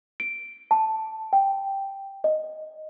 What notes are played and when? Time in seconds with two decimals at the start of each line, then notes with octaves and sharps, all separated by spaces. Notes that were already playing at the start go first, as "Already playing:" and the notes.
0.20 D7
0.71 A5
1.33 G5
2.24 D#5